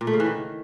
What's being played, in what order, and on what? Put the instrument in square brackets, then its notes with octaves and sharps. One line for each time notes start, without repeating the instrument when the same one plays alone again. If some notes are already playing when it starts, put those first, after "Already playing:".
[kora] A#2
A3
C#3
E3
D#3